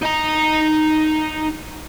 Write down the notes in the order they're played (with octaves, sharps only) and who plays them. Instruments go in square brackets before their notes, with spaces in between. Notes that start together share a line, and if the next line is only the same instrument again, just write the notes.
[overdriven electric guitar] D#4 A#5